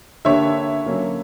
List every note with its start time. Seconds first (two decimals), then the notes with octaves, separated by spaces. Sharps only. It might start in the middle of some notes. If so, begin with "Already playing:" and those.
0.25 D3 A#3 D4 G4 C#5 E5
0.86 D3 F#3 A#3 C#4